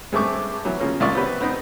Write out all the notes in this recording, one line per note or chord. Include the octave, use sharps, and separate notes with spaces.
G2 G#3 A3 C4 C#6 D6
E3 F#3 B3
C#3 F3 A#3 C#4
C2 D#3 E4 F4 D5 C#6
B3 C4 F#4 G4 B4
B3 C4 D#4